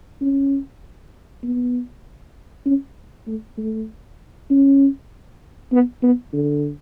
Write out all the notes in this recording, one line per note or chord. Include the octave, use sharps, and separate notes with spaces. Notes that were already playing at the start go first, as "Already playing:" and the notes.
C#4
B3
C#4
A3
A3
C#4
B3
B3
D3